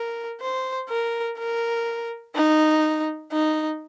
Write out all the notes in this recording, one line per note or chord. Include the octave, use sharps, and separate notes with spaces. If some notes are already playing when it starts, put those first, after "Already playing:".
Already playing: A#4
C5
A#4
A#4
D#4
D#4